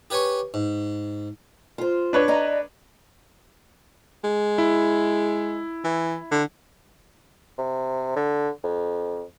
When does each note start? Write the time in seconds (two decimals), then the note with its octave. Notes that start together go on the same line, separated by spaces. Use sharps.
0.10 G4 B4 C#5 G#5 C#6
0.54 G#2
1.78 F4 C5
2.13 D4 B4 C#5
2.28 D5 D#5 A#5
4.24 G#3
4.58 E4
5.84 E3
6.32 D3
7.58 C3
8.16 D3
8.64 F2